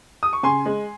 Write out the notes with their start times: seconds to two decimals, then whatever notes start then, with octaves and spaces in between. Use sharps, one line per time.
0.23 D#6
0.33 C#6
0.43 C#3 G#5 C6
0.66 G#3